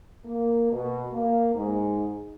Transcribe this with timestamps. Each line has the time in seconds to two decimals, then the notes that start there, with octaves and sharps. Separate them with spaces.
0.25 A#3
0.71 B2
1.13 A#3
1.54 G#2